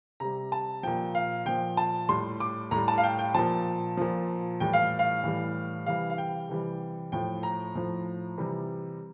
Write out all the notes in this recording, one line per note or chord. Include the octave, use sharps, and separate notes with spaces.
C3 G3 A#5
A5
A#2 F3 G5
F5
A#2 F3 G5
A5
A2 G3 C6
D6
A2 G3 A#5
A5
F5
G5
G5
A#2 F3 A5
A#2 F3
A2 E3 G3 G5
F5
F5
A2 E3 G3
C3 E3 G3 F5
F5
G5
C3 E3 G3
A2 F3 G5
A#5
A2 F3
C3 E3 G3